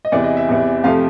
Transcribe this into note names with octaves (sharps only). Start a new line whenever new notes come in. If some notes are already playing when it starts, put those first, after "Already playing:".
D#5
E2 C3 E3 D5
D#5
E5
E2 C3 E3
F2 C3 F3 A3 F5